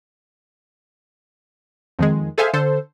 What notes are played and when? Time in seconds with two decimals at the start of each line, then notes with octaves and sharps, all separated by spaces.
1.99 F2 D#3 G#3
2.38 G#4 A4 C5 E5 F5 G#5
2.53 D3 A4 C5